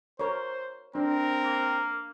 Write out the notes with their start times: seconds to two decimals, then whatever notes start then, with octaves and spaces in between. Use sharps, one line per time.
0.19 A#4 C5 C#5
0.95 C4 D4 A#4
1.44 A#3